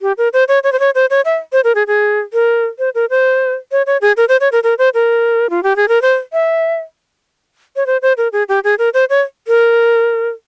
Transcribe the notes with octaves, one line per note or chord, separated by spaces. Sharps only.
G4
A#4
C5
C#5
C#5
C5
C#5
C5
C#5
E5
C5
A#4
G#4
G#4
A#4
C5
A#4
C5
C#5
C#5
G#4
A#4
C5
C#5
A#4
A#4
C5
A#4
F4
G4
G#4
A#4
C5
E5
C#5
C5
C5
A#4
G#4
G4
G#4
A#4
C5
C#5
A#4